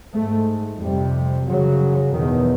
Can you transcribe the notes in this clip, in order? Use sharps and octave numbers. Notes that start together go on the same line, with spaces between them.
G#2 A3
F2 C3 G3
F#2 C#3 F#3
E2 B2 D#3